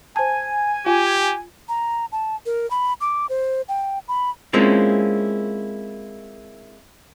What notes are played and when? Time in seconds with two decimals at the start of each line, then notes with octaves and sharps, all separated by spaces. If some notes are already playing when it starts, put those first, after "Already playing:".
0.16 C5 G#5 A5
0.86 F4 G4
1.69 A#5
2.12 A5
2.46 A#4
2.71 B5
3.01 D6
3.29 C5
3.69 G5
4.08 B5
4.53 G#3 A#3 C4 C#4 E4 F4